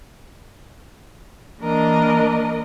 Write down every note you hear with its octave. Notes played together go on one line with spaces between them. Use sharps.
E3 A#3 D4 A#4 D#5